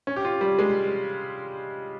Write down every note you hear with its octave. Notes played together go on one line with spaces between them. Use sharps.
C#4
G4
F4
G3
G#3